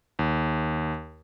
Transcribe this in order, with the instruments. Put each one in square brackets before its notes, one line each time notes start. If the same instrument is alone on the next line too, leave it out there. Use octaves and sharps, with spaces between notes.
[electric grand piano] D#2